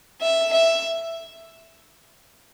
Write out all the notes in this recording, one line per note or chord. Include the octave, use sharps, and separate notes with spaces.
E5
E5